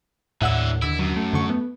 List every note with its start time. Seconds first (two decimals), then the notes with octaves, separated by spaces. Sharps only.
0.42 D#2 A2 D3 E4 E5 F#5 E6
0.82 D#2 D3 E4 E6
0.99 F#2 F#3
1.16 A3
1.33 F2 D3 C#6
1.50 B3